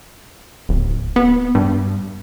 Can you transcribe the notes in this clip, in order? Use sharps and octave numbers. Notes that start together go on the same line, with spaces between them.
D1
B3
G2